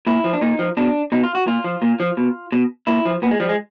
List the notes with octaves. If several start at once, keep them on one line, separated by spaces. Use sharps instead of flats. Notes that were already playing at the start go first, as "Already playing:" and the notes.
A#2 E4
F3
D4
A#2 D#4
F3
B2 D4
B2 D#4
F4
F#4
A#2 F4
F3
A#2
F3
B2
B2
A#2 E4
F3
A#2 B3
G#3
F3 G3
G#3